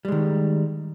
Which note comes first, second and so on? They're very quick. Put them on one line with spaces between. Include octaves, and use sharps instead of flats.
G3 G#3 D#3